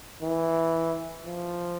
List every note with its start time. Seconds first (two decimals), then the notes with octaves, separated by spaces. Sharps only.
0.22 E3
1.26 F3